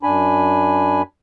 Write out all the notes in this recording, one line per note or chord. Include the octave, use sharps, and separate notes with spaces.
F#2 D4 G#5 B5